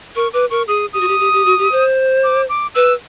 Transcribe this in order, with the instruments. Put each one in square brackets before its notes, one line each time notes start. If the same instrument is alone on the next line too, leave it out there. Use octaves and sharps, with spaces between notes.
[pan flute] A#4 [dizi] C#6
[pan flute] B4 [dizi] D6
[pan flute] A#4 [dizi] C#6
[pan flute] G#4 [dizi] D#6
[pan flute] G4 [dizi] D#6
[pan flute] F#4
G4
G4
G4
F#4
G4
C5
[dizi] D6
D6
[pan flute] B4 [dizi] E6